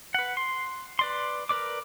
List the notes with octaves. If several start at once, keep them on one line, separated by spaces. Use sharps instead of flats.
B4 F#5
C6
B4 D5 C6
A#4 B4 D5 D6